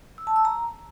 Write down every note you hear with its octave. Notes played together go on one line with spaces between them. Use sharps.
E6
A5
E6
A#5